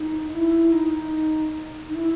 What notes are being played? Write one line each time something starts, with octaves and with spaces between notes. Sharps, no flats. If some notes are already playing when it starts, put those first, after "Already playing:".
Already playing: D#4
E4
D#4
D#4
E4